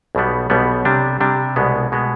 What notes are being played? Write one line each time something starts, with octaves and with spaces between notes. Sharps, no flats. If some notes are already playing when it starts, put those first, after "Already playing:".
B1 B2 G3 B3
B1 B2 G3 B3
C3 G3 D4
C3 G3 D4
C2 B2 G#3 B3
B2 G#3 B3